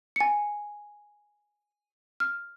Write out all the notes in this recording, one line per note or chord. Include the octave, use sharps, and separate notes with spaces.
G#5 C#7
F6